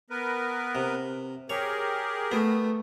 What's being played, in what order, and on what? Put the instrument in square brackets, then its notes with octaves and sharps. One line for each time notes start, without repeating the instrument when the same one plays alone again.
[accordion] B3 A#4 B4
[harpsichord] C3
[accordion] G4 G#4 A#4 [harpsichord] C#5
[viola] A3 [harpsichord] B3